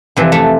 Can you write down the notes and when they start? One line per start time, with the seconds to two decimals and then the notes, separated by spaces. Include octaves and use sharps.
0.16 F2 C3 E3
0.32 A3